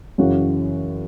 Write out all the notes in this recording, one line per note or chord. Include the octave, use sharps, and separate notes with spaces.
F#2 C#3 E3 F#4